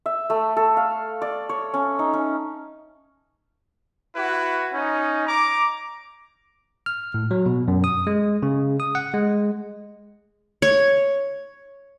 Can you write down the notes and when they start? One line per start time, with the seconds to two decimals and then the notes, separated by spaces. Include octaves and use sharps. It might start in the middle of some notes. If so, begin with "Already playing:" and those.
0.06 E5
0.30 A3
0.57 A4
0.77 F5
1.22 D5
1.49 C#5
1.74 C#4
1.99 D#4
2.14 C#4
4.16 E4 F#4 B4
4.74 C#4 D#4
5.27 A#5 D6
6.86 F6
7.14 A2
7.31 F#3
7.46 B2
7.68 F#2
7.84 D#6
8.07 G#3
8.43 C#3
8.80 D#6
8.95 F#5
9.14 G#3
10.62 C#5